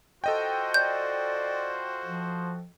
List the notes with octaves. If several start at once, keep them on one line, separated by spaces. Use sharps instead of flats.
F4 F#4 A4 C5 D#5 G5
D5 G6
F3